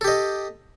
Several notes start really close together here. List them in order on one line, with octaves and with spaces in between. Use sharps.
A4 G4 D#5